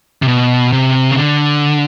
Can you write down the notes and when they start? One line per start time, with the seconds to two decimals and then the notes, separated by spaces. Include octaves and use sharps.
0.22 C3
0.28 B2
0.72 C3
1.11 C#3
1.17 D3